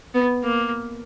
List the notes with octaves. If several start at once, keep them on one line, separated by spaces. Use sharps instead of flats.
B3
A#3